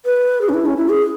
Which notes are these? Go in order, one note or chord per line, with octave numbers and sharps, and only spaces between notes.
B4
G#4
C#4
E4
C#4
E4
G#4